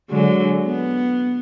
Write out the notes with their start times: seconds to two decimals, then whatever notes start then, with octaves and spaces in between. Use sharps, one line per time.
0.10 D3 F#3 G#3
0.64 B3